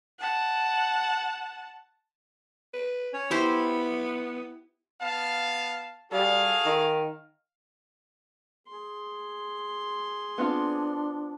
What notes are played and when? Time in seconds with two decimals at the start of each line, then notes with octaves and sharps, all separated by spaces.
0.19 F#5 A5
2.74 B4
3.14 C#4 C#5
3.31 B3 E4 G4 C5 B5
5.02 B3 F5 A5
6.12 G3 F#4 G#4 A4 F5
6.66 D#3
8.67 G#4 C6
10.38 B3 C4 D4 F4